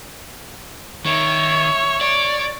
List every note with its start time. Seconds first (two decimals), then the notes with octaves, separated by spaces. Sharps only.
1.06 D#3 C#5 E5
2.01 C#5 D5